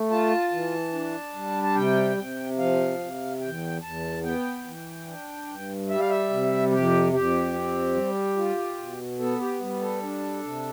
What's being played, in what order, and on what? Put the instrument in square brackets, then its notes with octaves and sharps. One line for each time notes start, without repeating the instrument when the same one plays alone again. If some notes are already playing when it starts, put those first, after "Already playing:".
Already playing: [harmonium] A3
F4 A5
E3
D4
G3
A5
C3 G5
C3
F3 F5
C3
E2 G5
E2 A5
B3 G5
E3
D4
G2
G3 E5
F5
E5
C3
F2 G4
F2 G4
C4
G3
F4
B2
B3 A4
G4
G3
A4
D4
C3